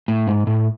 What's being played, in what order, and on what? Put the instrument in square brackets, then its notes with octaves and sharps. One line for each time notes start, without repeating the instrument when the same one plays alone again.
[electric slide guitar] A2
G#2
A2